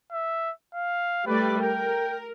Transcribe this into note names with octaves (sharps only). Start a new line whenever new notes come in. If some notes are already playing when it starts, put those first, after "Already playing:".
E5
F5
G3 A3 B4 D5
A#4 G5